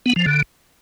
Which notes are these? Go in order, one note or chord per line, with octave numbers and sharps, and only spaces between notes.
B3
F3
D3